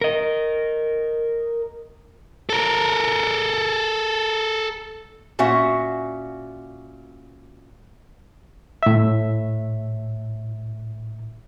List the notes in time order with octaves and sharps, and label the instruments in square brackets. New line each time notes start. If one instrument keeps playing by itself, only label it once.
[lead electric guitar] A#4 D#5
A4 A#4
[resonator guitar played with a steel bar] A#2 C#4 F#4 E5 F#5
[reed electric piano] A2 E5